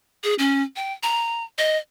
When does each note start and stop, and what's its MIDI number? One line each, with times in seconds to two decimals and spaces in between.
0.24 0.34 68
0.39 0.62 61
0.76 0.93 79
1.03 1.44 82
1.58 1.77 75